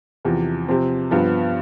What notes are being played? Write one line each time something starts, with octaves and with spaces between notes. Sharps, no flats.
E2 C3 F3
C3 F3 C4
G2 F3 B3